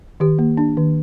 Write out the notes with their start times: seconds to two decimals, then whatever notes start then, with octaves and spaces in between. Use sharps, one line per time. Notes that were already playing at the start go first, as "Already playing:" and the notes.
0.20 D#3 G4
0.39 A#3
0.57 D4
0.77 D#3